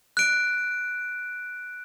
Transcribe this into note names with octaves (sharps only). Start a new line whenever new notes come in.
F#6 D7